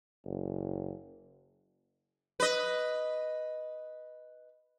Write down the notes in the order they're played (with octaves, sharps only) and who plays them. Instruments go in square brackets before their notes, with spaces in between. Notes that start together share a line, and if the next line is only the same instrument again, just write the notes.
[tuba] F#1
[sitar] B4 D#5